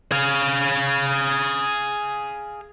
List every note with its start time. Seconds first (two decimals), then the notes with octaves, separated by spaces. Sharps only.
0.11 G#4 F5